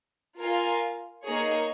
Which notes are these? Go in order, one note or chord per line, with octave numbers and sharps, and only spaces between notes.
F4 A#4 F5 G#5
A#3 D#4 G#4 C#5